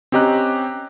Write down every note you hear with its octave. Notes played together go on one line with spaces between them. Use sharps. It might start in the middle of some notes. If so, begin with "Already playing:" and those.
C4 C#4 G4 D#5 A#5 F#6